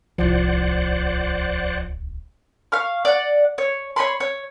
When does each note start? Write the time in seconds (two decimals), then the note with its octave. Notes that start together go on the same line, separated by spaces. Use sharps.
0.18 D1 C2 F3 C5 D5 F#5
2.72 F5 C#6 F6
3.05 D5 F#5
3.58 C#5
3.96 C#5 D#5 B5 C6
4.20 C#5